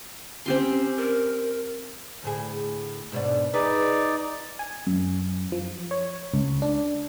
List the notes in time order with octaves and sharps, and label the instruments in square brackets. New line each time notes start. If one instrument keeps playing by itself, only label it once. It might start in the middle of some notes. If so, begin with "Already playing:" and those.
[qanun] C4 G4 C6 [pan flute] C#4
[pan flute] A#4
[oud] D2 A2 G#4
G#2 B2 D4
[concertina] D#4 D5 [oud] G#4 B4
[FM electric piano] G#5
F#2
F3
C#5
C#2
D4